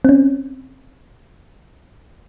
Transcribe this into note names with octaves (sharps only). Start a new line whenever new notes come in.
C4 C#4